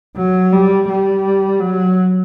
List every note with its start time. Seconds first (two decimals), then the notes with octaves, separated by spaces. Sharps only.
0.17 F#3
0.52 G3
0.88 G3
1.60 F#3